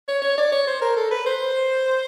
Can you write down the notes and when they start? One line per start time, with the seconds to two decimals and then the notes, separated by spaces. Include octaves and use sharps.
0.08 C#5
0.22 C#5
0.38 D5
0.52 C#5
0.67 C5
0.81 A#4
0.96 A4
1.11 B4
1.26 C5